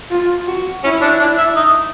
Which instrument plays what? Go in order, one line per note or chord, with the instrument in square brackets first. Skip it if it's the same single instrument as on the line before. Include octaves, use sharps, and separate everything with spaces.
[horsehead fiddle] F4
F#4
[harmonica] C#4 [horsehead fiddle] E4
[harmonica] D4
D4
E4
D#4